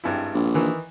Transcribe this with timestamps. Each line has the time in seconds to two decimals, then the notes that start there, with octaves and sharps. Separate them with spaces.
0.04 G#1 G2 E4
0.34 A#1
0.55 D#3 E3